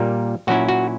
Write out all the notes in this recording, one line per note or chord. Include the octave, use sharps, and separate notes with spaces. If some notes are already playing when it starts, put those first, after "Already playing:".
Already playing: A#2 G3 A#3
A#2 F#3 C#4 E4 F#4
F#4